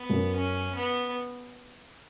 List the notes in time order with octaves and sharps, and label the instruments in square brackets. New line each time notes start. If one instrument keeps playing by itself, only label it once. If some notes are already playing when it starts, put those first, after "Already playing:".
Already playing: [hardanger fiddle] B3
[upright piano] F#2
[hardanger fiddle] C#4
B3